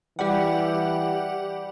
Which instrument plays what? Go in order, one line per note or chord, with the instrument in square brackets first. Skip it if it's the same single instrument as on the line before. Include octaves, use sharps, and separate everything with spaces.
[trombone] E3 [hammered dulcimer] G3 [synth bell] G4 F#5